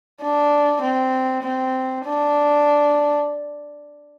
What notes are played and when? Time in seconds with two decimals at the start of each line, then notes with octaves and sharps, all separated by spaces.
0.21 D4
0.82 C4
1.43 C4
2.05 D4